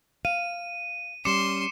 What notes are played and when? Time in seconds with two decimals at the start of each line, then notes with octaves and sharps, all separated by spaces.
0.25 F5 D#7
1.25 G3 C#4 C6 D6 C#7 E7